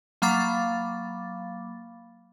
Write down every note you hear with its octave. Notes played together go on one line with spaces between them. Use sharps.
F#3 A#3 F5 B5 D6 A6